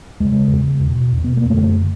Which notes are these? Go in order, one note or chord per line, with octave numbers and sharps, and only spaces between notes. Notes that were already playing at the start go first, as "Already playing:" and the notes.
E2 C#3 G#3
E2 C#3
E2 B2
E2 B2
B3
A#3
F#2 D3 A3